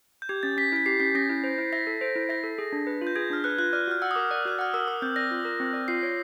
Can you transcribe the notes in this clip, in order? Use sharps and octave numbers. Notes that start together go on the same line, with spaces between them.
G6
G4 G#6
C#4 A6
C#4 B6
E4 B6
G4 C7
C#4 B6
C#4 A#6
E4
C5
E4
E5 A#6
A4
C5
E4
E5 A#6
A4
G#4
D4
B4
F4
G6
G#4 G#6
D4 F6
B4 F#6
F4 F#6
D5 F6
F#4 F6
F#5 E6
D#6
A#4 D6
D5
F#4 F#6
F#5 F6
A#4 E6
A#4 D#6
C4 G6
D5 A#6
F4
A#4
C4
D5
F4 C7
C#5